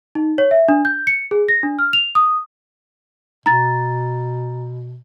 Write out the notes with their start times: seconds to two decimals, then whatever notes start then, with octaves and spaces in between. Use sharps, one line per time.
0.15 D#4
0.38 C#5
0.51 E5
0.68 D4
0.85 G6
1.07 C#7
1.31 G#4
1.48 A#6
1.63 D4
1.79 F6
1.93 F7
2.15 D#6
3.46 B2 A#5 A6